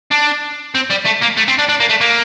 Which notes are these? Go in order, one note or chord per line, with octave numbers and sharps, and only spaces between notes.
D4
C4
G3
A3
A#3
A3
C4
D4
D4
A#3
A3
A#3